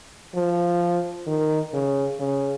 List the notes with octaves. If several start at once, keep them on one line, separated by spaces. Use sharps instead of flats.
F3
D#3
C#3
C#3